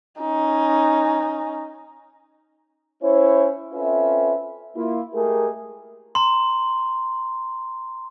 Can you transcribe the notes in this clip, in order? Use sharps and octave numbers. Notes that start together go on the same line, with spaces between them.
C#4 D#4
C#4 E4 C5 C#5
C4 C#4 F4 A4 B4 E5
A#3 E4 F4
G#3 A3 G4 G#4 A#4
A#5 C6